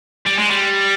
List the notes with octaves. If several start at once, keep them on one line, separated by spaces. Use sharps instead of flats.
G3
G#3
G3